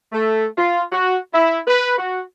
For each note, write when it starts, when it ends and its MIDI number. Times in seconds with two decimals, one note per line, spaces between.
0.13 0.46 57
0.57 0.82 65
0.92 1.18 66
1.33 1.60 64
1.67 1.95 71
1.98 2.21 66